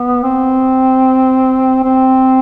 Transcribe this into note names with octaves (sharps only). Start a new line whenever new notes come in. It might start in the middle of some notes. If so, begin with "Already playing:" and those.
Already playing: B3
C4
C4